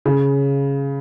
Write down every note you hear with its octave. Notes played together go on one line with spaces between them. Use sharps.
C#3